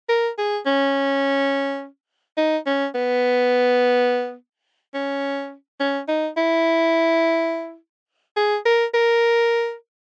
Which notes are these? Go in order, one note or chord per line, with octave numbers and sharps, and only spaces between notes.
A#4
G#4
C#4
D#4
C#4
B3
C#4
C#4
D#4
E4
G#4
A#4
A#4